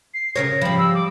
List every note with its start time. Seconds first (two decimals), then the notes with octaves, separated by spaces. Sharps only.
0.14 C7
0.36 C#3 A#4 C#5 A#6
0.61 F3 G3 B5
0.78 E6
0.95 D6